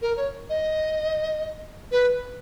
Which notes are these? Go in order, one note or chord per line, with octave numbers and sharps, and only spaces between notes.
A#4
C#5
D#5
B4